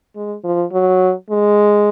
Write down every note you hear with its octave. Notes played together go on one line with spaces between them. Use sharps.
G#3
F3
F#3
G#3